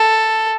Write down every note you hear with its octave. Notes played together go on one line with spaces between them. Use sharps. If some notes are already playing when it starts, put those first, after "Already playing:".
Already playing: A4